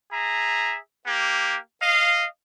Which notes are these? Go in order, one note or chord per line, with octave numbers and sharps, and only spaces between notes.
G#4 E5 A#5
A#3 G4
D#5 F5